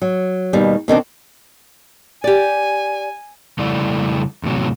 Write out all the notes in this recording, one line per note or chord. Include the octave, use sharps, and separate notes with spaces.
F#3
D#2 B2 G3
B2 D#3 C4 D4
G4 D5 G#5
F2 C#3 G3 A3 E4 D5
E2 A2 C3 F#3